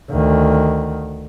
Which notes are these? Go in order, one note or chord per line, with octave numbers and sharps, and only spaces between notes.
D2 D#3